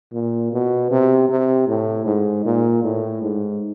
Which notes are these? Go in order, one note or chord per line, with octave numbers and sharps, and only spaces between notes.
A#2
B2
C3
C3
A2
G#2
A#2
A2
G#2